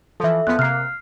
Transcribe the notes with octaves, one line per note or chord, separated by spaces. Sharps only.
E3 F3 A4 E5
E2 F3 B3 F#6
C3 A#3 F6 C7